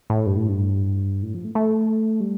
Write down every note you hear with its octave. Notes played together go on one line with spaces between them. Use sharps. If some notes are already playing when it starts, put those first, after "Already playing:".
A2
G2
A2
G2
A2
F3
A3
A3
G3